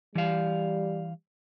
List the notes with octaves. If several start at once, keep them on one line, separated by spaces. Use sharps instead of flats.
E3 G3 F5